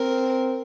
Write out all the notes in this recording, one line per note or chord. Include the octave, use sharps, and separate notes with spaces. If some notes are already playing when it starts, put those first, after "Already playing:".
Already playing: C4 A#4